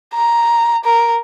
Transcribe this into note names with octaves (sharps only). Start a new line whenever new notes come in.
A#5
A#4